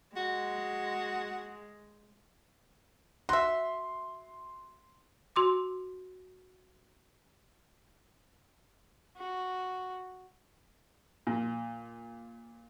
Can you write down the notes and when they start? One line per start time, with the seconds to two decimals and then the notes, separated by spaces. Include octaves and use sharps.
0.16 G#3 F#4
3.29 F#4 E5 C6
5.36 F#4 C6 D6
9.17 F#4
11.27 A#2